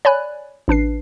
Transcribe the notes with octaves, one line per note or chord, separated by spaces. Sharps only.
C#5 D5 G#5 B5 F#6
A1 D4 B4 C7